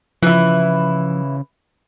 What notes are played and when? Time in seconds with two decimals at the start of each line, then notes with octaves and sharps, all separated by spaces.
0.23 C#3 E3 F3 E4